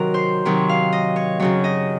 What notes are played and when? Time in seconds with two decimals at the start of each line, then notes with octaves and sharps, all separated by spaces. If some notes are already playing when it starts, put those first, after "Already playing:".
Already playing: C3 D#3 F#3 F#4 A#4
0.14 C5
0.45 C3 D#3 F#3 C#5
0.69 F5
0.92 D#5
1.16 C#5
1.40 F#2 C#3 F#3 C#5
1.64 D#5